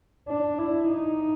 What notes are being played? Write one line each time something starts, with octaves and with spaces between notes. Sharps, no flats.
D4
E4
D#4